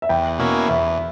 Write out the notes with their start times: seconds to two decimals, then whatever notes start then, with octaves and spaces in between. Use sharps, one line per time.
0.02 E5
0.09 E2 G5
0.39 B2 A#3 C#4 E4
0.69 E2 E5